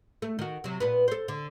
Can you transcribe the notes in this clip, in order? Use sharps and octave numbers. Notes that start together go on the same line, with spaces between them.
A3
D#3 F#4
C3 F#3
A#2 B3 B4
A4 C5
D3